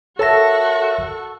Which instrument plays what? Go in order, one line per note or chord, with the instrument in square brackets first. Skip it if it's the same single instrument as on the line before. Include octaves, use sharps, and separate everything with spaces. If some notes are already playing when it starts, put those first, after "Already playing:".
[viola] F#4 C#6 [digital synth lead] A4 [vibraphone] A#4 E5 [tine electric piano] C#5 A5 A#6